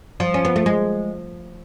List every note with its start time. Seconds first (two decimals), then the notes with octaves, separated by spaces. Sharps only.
0.20 F3
0.34 C#4
0.45 B3
0.56 A3
0.66 G#3